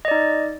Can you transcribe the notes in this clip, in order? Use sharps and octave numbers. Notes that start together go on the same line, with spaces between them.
D#4 D5 D#5